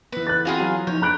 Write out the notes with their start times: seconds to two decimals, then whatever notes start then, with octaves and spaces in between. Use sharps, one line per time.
0.12 E3 B3 B4
0.27 F#6 A6
0.45 C4 F4 F#4 G#4 F5 B5
0.60 F#3
0.87 F3 D#4 C#5 G6
1.02 D4 B4 A#5 B5 F#6 G6 D7